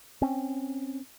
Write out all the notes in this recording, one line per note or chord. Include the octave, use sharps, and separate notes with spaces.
C4 C#4